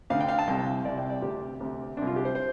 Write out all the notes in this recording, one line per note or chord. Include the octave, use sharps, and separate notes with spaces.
D2 F5
D3
G5
F5
A5
C2 C3 G5
C2 C3 D5
G5
D5
D2 C3 G4
D2 C3
C2 C3 D4
F4
G4
C5
C5